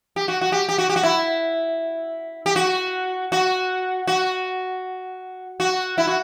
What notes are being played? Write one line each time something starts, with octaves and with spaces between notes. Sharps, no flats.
G4
F#4
F#4
G4
G4
F#4
G4
F#4
E4
G4
F#4
F#4
F#4
F#4
E4
F#4